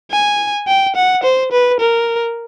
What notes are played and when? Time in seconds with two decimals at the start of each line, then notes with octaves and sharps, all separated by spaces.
0.12 G#5
0.68 G5
0.96 F#5
1.24 C5
1.52 B4
1.80 A#4